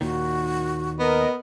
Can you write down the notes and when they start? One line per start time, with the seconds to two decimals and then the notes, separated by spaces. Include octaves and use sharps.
0.01 D#2 A#2 D#3 F#4
0.99 B3 A#4 D#5